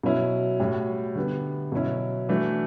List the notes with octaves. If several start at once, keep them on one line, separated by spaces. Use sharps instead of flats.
B2 F#3 C#4 E4
A2 G3 C#4 F#4
D3 G3 B3
B2 F#3 C#4 E4
E3 A3 D4 F#4